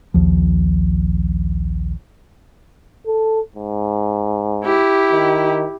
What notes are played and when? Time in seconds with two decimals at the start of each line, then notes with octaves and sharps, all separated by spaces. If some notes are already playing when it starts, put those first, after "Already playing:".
0.14 A#1 D#2 F3
3.07 A4
3.56 G#2
4.64 E4 G4
5.12 D#3